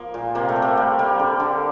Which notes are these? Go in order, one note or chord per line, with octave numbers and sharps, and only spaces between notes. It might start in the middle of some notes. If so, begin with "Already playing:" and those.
Already playing: F3 A#3
A#2
C3 A#3
A3
C3
A#3
G3
G3 A#3
D3
D3